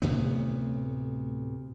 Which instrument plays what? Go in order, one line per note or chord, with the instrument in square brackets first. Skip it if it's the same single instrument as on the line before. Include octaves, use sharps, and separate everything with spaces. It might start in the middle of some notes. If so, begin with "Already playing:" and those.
[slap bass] D2 A2 C3 B3